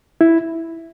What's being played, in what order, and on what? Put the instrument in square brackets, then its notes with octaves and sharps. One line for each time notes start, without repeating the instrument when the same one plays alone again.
[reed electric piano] E4